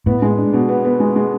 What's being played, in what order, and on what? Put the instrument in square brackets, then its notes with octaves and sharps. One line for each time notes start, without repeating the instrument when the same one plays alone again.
[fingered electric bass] A2 [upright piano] B3
[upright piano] G#3
D4
B2
B3
B3
G#3
G#3